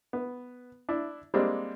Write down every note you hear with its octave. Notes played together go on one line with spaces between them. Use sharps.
B3
D4 E4
G3 G#3 A#3 C4 D4